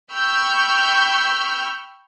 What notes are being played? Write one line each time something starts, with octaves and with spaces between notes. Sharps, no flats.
G5 B5 C#6 E6 F6 G6